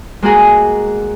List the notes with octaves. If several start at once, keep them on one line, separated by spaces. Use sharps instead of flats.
G#3 A#3 F#4 G#4